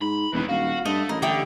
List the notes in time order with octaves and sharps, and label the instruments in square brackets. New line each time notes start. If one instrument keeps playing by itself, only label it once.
[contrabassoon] G#2 [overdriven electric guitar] B5
[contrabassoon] E1 [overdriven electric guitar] D#2 D#3 [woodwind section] E4 B4
[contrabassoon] D#1 [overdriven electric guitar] F#4 [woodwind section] F5
[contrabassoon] G2 [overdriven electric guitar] A3 [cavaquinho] D#5
[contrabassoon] A1 [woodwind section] E4 D#5 [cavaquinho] A#4
[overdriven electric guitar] D3 [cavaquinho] E4 G5 D#6 [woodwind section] G4